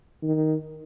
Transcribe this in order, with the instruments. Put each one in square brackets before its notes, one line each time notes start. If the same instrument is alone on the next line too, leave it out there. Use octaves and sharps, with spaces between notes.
[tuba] D#3